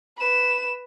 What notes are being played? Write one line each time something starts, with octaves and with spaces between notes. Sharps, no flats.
B4 E7